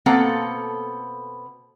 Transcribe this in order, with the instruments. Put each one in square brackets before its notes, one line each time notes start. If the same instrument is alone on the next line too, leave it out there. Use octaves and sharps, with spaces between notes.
[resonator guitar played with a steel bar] B2 A#3 C4 A4 F5 F#5